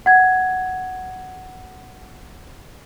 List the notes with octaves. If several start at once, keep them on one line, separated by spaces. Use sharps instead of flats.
F#5 G#6